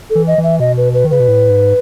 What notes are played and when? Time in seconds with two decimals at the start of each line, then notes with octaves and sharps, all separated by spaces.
0.10 A4
0.15 E3
0.27 D#5
0.38 E3
0.44 E5
0.60 B2 D#5
0.77 B4
0.94 B4
1.05 D#3
1.10 C#3 B4
1.20 B2
1.28 A2
1.50 G#2